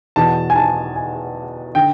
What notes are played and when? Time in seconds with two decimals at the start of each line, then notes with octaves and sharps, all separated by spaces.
0.16 E2 B2 A5
0.50 G#5
0.56 A5
0.95 G#5
1.75 D3 G5